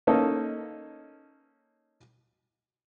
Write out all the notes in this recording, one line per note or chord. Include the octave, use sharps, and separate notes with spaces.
A#3 C#4 D#4 A4